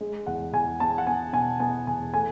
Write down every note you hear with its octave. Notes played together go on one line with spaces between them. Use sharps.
G#3
E2 F#5
E2 G#5
B3 A5
F#5
B3 G#5
B2 G#5
B3 G#5
E2 G#5
A3 G#5